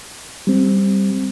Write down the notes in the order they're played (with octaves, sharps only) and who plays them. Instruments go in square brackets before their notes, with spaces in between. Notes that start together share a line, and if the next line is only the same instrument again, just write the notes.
[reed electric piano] G3 C4